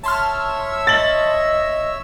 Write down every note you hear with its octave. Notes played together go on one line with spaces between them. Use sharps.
C#5 E5 A5 C6 E6 F6
D#5 A6 F#7